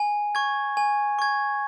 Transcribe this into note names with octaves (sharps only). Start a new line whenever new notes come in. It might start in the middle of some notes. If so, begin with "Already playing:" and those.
Already playing: G#5
C#6 G#6
G#5
C#6 G#6